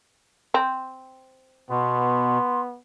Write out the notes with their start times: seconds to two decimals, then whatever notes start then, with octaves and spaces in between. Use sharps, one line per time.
0.54 C4
1.70 B2 B3 C6